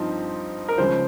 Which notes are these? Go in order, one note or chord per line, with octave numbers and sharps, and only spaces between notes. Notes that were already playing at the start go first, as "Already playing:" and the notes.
Already playing: G2 F3 C4 D#4
A#4
C#2 C#3 F3 C5